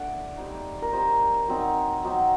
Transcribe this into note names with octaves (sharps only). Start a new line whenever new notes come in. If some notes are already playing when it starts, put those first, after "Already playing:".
Already playing: A3 D4 D5 F#5
G3 C4 D#4
A#4
G3 C4 D#4 C5
F#3 C4 D#4
F#3 C4 D#4